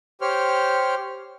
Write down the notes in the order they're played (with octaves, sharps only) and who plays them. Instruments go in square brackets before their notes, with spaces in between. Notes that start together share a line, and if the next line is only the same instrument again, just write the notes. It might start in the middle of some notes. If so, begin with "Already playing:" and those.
[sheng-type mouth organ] G4 C5 C#5 F6